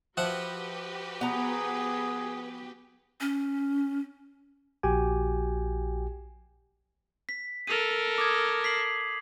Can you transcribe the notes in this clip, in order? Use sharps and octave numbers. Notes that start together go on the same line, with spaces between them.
F3 F#4 G4 B4 E5 F#5
B3 G#4 A#5
C#4
A#1 F#4 G4 G5 G#5
B6
A4 A#4 D#7 F7
D6 D#6 G#6
B6 C7 F#7